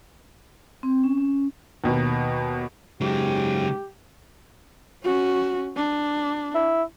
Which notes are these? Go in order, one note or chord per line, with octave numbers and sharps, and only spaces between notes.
C4
C#4
C#4
D#2 B2
G#2 C#3 F#3 G4
C#4 F#4
D4
E4